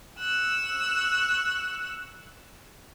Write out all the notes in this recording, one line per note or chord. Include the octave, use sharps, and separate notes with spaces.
C#6 E6 F#6